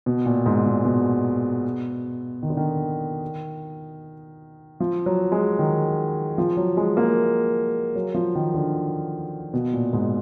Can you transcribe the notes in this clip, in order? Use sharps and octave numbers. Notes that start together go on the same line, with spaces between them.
B2
A#2
G#2
A#2
B2
D#3
D3
D#3
F3
F#3
G#3
D#3
F3
F#3
G#3
A#3
F#3
F3
D#3
D3
B2
A#2
G#2